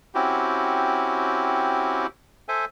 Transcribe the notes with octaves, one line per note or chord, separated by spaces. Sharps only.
C4 C#4 E4 F#4 G4
A4 C5 E5 G#5